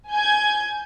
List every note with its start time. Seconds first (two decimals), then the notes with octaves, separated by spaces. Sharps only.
0.11 G#5 G6 G#6